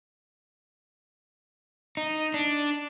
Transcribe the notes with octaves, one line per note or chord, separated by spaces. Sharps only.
D#4
D4